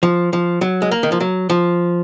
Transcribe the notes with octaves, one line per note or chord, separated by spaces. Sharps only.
F3
F3
F#3
G#3
A#3
D#3
F3
F#3
F3